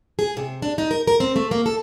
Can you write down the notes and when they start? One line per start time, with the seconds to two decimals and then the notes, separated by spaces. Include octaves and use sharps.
0.19 G#4
0.37 C3
0.62 D4
0.78 D#4
0.91 A#4
1.07 A#4
1.20 C4
1.36 A3
1.51 A#3
1.66 A4